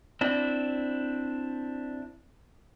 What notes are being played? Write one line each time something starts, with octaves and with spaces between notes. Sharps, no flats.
C4 D4 E4